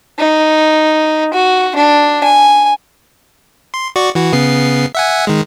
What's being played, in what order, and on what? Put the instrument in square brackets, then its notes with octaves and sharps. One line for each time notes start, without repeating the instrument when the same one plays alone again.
[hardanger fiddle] D#4
F#4
D4
G#5
[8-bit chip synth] C6
F#4 D5 C#6
E3 F#4
C#3 B3 C7
E5 F#5 G#5
D#3 G#3